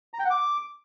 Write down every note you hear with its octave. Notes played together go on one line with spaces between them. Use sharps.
A#5
G5
F#5
D6